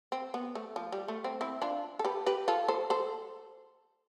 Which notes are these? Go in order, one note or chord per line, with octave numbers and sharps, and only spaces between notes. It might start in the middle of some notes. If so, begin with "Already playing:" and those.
C4
B3
A3
F3
G3
A3
C4
C4 E4
D4 F4
A4
G4 B4
G4 B4
F4 A4
A4 C5
A4 C5